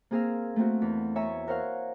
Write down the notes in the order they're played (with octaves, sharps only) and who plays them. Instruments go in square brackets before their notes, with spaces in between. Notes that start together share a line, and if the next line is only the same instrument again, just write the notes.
[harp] A#3 C4 G#4 A#4 F5 E6
A3 A#3 C4 F#4
E2
C#5 E5 G#5 A#5 C#6
F#4 A#4 C5 C#5 F5 F#5